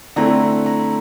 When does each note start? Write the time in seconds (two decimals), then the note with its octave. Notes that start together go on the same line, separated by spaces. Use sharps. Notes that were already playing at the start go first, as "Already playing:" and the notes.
0.16 D3 A3 C4 E4 A#5
0.66 A#5